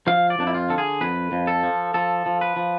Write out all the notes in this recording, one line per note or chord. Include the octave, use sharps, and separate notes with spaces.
F3 F5
D5
F2 D4
E4
F4
D3 A4
G#4
F2 B4
F2
A4
F3
F3 A4
F3
B4
F3